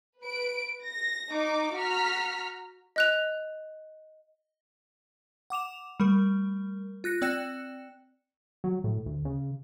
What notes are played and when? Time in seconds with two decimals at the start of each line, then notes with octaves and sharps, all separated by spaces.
0.23 B4 D7
0.84 A#6
1.33 D#4 D6
1.75 F#4 A#5 F6 B6
2.96 D#5 F#6 F7
5.50 F#5 D6 E7 F7
6.00 G3 A3 A#4
7.04 F4 F#6 A#6 C#7
7.22 C4 D5 G5 F#6 C#7 E7
8.64 F#3
8.84 A2
9.06 D2
9.25 C#3